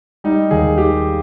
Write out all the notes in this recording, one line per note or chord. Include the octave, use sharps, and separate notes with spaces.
G3 D#4
D#2 G#4
D#3 G4